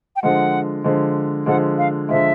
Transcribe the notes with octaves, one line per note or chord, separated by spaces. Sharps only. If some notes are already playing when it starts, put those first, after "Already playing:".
G5
D3 F3 G#3 F#5
D3 F3 G#3
D3 F3 G#3 F#5
F5
D3 F3 G#3 E5